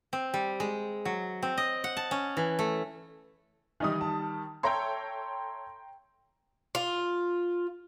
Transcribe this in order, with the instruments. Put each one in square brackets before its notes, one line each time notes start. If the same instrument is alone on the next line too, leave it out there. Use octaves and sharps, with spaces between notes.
[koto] C4
G3
G#3
F#3
C4
D#5
F#5
A5
C#4
E3
A3
[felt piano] D#3 G3 [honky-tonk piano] E3 D#4 D#6
[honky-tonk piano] A5
[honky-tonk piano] A4 C#5 E5 [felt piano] G5 A#5 C6
[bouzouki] F4